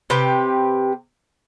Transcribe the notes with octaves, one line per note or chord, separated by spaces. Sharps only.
C3 G4 B4 G5